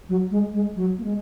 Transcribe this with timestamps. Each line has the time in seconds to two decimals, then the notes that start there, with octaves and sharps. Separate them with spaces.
0.09 F#3
0.31 G#3
0.53 G#3
0.75 F#3
0.98 A#3
1.04 G#3